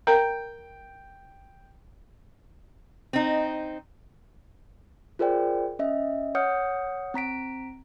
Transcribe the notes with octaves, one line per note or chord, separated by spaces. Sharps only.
A#4 G5 A#5
C4 D#4
F4 G#4 A#4 C5 D5 G5
C#4 D#5 E5
C#5 F#5 D#6 F6 G6 C#7
C4 A#5 B6 D7